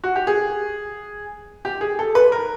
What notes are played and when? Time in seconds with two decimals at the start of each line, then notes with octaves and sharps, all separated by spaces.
0.04 F#4
0.16 G4
0.27 G#4
1.65 G4
1.81 G#4
1.99 A4
2.15 B4
2.32 A#4